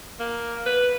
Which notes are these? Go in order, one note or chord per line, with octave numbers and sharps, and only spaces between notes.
A#3
B4